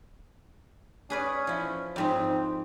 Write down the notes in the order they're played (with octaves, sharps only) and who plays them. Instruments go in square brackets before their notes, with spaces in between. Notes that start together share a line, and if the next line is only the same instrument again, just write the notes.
[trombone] C#4 [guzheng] G#4 B4 D5
[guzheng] F3 E4
[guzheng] F2 G#2 D#4 [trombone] C4